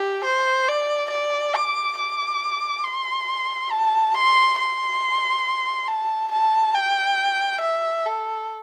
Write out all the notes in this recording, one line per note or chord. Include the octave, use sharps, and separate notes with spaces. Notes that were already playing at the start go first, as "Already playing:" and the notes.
Already playing: G4
C5
D5
D5
D6
D6
C6
A5
C6
C6
A5
A5
G5
E5
A4